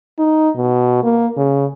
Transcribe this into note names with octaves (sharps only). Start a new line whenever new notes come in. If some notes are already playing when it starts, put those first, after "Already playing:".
D#4
B2
A#3
C#3